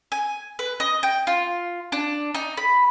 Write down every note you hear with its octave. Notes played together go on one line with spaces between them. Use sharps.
G#5
B4
D#5
G5
F4
D4
D#4
B5